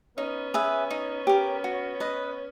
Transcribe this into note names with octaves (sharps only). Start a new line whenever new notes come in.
B3 C#4 D#4
G#4 B4 E5
D#4
G4 A#4
F#4
B4 D#5